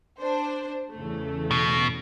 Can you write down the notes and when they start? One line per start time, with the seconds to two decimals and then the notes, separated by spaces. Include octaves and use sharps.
0.20 D4 C5
0.93 E2 C#3 A3
1.51 B2